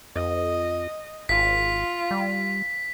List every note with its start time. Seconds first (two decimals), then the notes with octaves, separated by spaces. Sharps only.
0.16 F2 D#5
1.29 G#1 F4 B6
2.11 G3